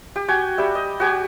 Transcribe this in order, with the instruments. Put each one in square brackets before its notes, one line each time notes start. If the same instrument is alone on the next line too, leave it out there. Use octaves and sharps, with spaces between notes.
[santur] G4
F#4 G5 G#5
G3 G4 E5
D#5
F#4 G4 G#5